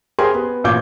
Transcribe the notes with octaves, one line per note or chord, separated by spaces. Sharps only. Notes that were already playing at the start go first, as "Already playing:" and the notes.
G4 G#4 A#4 C5 G#5 C6
B3
A1 A#2 F4 D6 G6 G#6